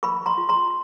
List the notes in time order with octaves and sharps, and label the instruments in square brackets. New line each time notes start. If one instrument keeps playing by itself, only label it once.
[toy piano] A#4 B5 C#6
A#5 C6
F4
A#5 C6